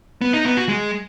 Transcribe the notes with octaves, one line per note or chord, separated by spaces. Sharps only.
B3
D#4
B3
F#4
G#3